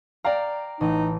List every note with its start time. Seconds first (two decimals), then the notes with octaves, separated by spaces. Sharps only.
0.25 D5 F5 G5 A#5
0.81 A1 D#4